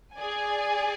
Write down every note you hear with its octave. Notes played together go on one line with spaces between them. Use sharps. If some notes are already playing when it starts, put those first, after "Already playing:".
G#4 D5 G#5